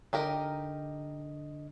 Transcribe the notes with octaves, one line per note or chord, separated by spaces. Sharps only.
D3 D4 D#4 G4 A#4 D#5